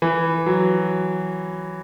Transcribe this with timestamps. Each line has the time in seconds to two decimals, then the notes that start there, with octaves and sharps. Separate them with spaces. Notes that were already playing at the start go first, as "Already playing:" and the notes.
0.02 E3
0.46 F#3